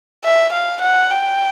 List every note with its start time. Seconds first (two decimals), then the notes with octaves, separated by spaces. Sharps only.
0.25 E5
0.53 F5
0.82 F#5
1.11 G5